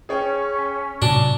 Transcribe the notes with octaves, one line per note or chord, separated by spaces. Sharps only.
C#4 G#4 C#5 G5
A2 C3 F#3 B3 D4